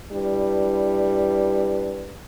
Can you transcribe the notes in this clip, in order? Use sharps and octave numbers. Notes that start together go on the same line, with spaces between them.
G3 D4 E4 B4